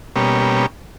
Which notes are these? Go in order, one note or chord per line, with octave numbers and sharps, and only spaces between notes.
B2 G3 A#3 C#4